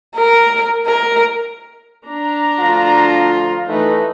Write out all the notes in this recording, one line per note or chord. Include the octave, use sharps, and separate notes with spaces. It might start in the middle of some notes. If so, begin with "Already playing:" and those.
A#4
A#4
D4 A#5
D2 F3 F4
E3 A3 D#4 B4